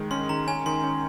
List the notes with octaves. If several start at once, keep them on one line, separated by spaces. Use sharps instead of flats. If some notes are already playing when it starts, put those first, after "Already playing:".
Already playing: D#3 G#3
C#4 C6
D#3 A#5
C#4 G#5
D#3 C6
C#4